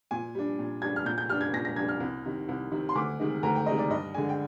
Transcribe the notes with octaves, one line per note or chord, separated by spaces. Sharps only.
A#2 G#5
G3 D4
A#2
G3 D4 G#6
F6
A#2 G6
G6
G3 D4 F6
G#6
A#2 A#6
A#6
G3 D4 G#6
F6
C2
C3 D#3
C2
C3 D#3
C6
D2 D6
C3 D#3 G#3 D#4
D2 A#5
G5
C3 D#3 G#3 D#4 D#5
D5
G2 D#5
D3 G#3 D4 G#5
G5